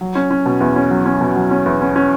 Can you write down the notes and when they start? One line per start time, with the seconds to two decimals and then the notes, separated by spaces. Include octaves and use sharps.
0.01 F#3
0.15 C#4
0.31 C#4
0.46 B2
0.60 E2
0.76 C#4
0.91 F#3
1.06 C#4
1.21 B2
1.36 F#3
1.51 C#4
1.66 E2
1.81 C#4
1.96 C#4